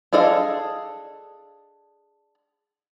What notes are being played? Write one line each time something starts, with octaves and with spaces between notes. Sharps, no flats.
D4 G#4 A4 D#5 F5